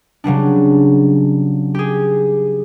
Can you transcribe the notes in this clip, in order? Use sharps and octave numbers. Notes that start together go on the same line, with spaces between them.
C#3 F#3 G3 D4
G4 G#4